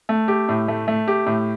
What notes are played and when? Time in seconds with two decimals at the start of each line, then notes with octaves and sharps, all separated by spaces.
0.09 A3
0.28 G4
0.49 A2
0.68 A3
0.88 A3
1.08 G4
1.26 A2